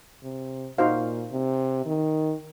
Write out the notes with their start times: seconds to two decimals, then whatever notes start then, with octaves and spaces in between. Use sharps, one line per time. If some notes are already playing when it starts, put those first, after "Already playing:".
0.23 C3
0.78 A#2 D#4 F#4 C5 F5
1.32 C3
1.86 D#3